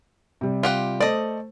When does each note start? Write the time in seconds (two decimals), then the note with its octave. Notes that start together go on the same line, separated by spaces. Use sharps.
0.41 C3 G3
0.63 F4 G4 F#5
1.00 A3 A4 C5 D5 D#5